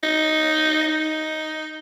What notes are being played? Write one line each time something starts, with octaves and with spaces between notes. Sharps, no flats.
D#4
D#4